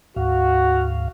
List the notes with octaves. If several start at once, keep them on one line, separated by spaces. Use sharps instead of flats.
D2 G#2 F#4 F5